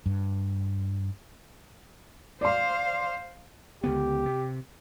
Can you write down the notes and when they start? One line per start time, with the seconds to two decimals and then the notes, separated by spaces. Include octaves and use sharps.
0.06 G2
2.41 C5 D5 F5 C6
3.84 C#2 D3 B3 G4
4.26 C3